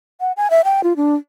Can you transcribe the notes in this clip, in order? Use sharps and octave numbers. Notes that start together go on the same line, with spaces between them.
F#5
G#5
E5
G5
F4
D4